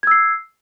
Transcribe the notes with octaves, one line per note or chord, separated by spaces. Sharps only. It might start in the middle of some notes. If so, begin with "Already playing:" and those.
E6 G#6 C7